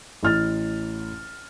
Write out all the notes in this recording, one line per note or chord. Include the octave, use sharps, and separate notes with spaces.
A1 F6 A6